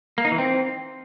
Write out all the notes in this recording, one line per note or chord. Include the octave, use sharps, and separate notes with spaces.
A#3
D#4
E3
C4